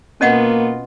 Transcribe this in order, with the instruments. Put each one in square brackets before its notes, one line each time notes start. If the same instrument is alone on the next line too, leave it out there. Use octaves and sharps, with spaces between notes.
[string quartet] B2 B3 F4 [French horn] A#3 [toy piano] C#4 D#5 F#5